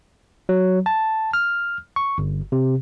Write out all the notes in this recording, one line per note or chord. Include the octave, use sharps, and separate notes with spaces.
F#3
A5
F6
C#6
G1
C3